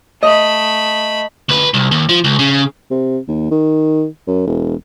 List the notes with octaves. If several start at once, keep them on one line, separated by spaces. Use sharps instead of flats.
A3 D#5 B5
D2 B4
C2
D#2
F3
C#2
C#3
C3
D#2
D#3
F#2
E1